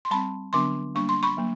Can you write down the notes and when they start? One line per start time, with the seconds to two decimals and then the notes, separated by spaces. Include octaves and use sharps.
0.05 C6
0.11 G3 C4 A5 B5
0.53 D3 F#3 B3 D4 C6 D6
0.95 G3 A#3 D4 C#6
1.09 C6
1.23 B5 C#6
1.37 F#3 A#3